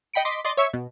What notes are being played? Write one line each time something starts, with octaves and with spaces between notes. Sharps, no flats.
D#5 G5 B5 C#7 D7
D#5 C6 D6 B6
D5 D#5 C6 A6
C#5 E5 C#6
B2